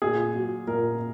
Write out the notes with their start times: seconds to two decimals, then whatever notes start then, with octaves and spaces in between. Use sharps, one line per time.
0.02 A#2 G#4
0.35 F#3
0.67 A#2 A#4